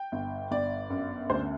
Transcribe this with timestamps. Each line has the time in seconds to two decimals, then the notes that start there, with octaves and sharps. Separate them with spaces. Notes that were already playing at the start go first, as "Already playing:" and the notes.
Already playing: G5
0.12 G1
0.51 G1 D5
0.90 F#2
1.30 D2 C5